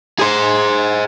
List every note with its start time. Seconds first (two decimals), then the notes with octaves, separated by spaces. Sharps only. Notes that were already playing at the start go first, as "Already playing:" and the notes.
0.19 G#4 C5